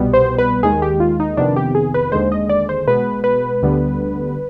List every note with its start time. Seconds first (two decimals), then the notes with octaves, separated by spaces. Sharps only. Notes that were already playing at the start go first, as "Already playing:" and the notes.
Already playing: C2 B2 G3 B3
0.14 C5
0.38 B4
0.63 D#2 D#3 G#3 G#4
0.82 G4
1.00 F4
1.20 D#4
1.37 F2 C3 D#3 B3 D4
1.56 G4
1.75 G#4
1.94 B4
2.12 D#2 D3 G#3 C5
2.32 D#5
2.49 D5
2.69 C5
2.88 B2 G#3 B3 B4
3.24 B4
3.62 D2 D3 G3 B3